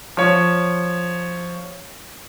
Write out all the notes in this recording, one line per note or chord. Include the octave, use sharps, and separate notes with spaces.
F3 C#5